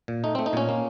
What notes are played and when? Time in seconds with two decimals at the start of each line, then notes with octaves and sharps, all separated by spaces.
0.08 A#2
0.24 A3 D#4
0.35 A3 C4
0.46 D#4
0.53 A#2 C#4
0.69 A#3